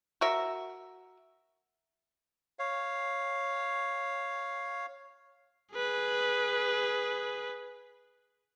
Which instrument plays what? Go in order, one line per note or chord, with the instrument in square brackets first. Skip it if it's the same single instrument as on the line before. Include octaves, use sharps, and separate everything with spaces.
[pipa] F#4 A#4 E5
[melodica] C#5 F5
[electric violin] G#4 B4